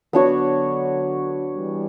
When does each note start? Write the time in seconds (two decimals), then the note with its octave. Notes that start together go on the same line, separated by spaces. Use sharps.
0.13 D3 F#3 B3 D4 F#4 C#5
1.54 E3 G3